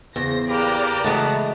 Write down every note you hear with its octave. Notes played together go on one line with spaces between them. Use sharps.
E2 C#3 C5 A#6
A#3 G4 B4 D5 A#5
E3 G#3 A3 B3 F#4 A5